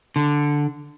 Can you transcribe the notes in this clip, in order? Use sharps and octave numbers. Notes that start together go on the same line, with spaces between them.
D3